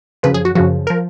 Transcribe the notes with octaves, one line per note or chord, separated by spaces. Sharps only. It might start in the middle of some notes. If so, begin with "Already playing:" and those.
F#2 C#3 F3 B4
G#4
F#4
F#2 C#3 F3 F#4
F3 A#4